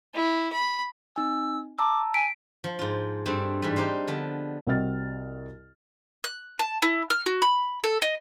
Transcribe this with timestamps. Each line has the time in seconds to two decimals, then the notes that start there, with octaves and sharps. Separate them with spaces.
0.15 E4
0.52 B5
1.16 C4 D#4 G#5 E6
1.79 A5 A#5 D6 E6
2.14 G#5 B6 D7
2.64 F3
2.79 G#2 F4
3.26 G2 A3 C4 A5
3.62 G#2 E3 G3
3.76 D4 D#4 G4 C5 F5
4.07 D3 F3 B3 A5
4.67 C2 C4 F#4 D#5 F6 A6
6.24 F#6
6.59 A5
6.82 E4
7.10 F6
7.26 F#4
7.42 B5
7.84 A4
8.02 D#5